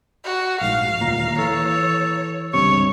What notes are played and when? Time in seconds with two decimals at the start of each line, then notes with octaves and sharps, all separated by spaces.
0.25 F#4
0.61 A#1 G#2 F5
1.01 D1 D#2 A#2 A#5
1.38 E3 A4 C#5
2.54 C#2 G2 C3 C#5 C#6